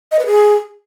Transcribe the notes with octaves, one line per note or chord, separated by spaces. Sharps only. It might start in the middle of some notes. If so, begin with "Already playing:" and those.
D#5
B4
G#4